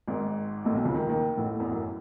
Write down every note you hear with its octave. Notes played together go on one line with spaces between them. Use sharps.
G#1 G#2
A1 A2
B1 B2
C#2 C#3
D#2 D#3
D#2 D#3
A1 A2
E2
F#2